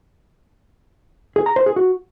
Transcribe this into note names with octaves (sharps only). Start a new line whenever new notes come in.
G#4
A#5
C5
G#4
F#4